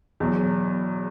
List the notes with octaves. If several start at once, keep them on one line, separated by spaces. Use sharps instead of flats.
E2 B2 F#3